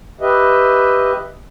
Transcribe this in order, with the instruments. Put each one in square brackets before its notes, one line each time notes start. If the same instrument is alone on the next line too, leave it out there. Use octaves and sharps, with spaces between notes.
[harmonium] G4 B4 D#5 E5